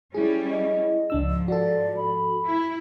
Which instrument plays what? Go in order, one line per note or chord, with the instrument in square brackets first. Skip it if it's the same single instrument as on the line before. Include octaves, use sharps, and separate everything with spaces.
[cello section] G3 C#4 [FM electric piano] E4 G#4
[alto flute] D#5
[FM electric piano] C#2 D4 E6 [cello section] G#2 F3
[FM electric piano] F#4 A4 [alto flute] D5
[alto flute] B5
[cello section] E4